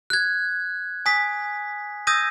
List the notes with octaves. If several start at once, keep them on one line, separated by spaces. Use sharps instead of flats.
F#6 G#6
G#5 D#6 B6
D#6 E6 G6 G#6 A#6 D#7